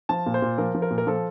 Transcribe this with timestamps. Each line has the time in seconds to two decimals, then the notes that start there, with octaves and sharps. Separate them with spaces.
0.09 F3 A5
0.26 A#2
0.34 C5
0.42 A#2
0.58 F3 A#4
0.74 F3
0.82 A#4
0.90 A#2
0.98 A#4
1.07 F3 A4